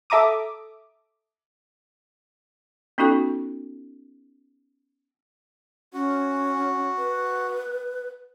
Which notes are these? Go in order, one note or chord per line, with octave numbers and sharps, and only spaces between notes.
A4 E5 A#5 D6 D#6
B3 C#4 D#4 F#4 A4 C#6
C#4 F#4
B4